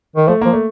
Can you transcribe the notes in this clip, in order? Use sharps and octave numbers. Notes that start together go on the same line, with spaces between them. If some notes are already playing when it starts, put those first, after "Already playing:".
D#3
F3 A3
F3 A#3
A3